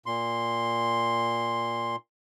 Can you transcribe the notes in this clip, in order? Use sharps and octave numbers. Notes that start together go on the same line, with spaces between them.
A#2 C6